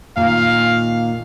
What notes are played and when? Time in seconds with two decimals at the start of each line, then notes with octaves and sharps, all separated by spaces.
0.16 A#2 D#3 F5